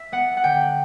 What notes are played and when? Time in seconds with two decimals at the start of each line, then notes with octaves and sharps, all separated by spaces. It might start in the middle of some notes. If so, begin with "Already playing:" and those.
Already playing: E5
0.12 B3 F#5
0.37 F#5
0.44 D3 G5